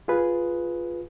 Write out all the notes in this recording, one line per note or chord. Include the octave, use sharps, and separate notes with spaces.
F4 G#4 B4